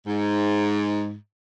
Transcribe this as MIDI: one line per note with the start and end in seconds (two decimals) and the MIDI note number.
0.07 1.15 44